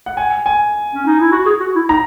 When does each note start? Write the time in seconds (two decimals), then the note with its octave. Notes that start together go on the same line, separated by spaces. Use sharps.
0.06 F#5
0.17 G#5
0.46 G#5
0.94 C#4
1.06 D#4
1.20 E4
1.32 F#4
1.46 G#4
1.60 F#4
1.75 E4
1.89 D#4 A#5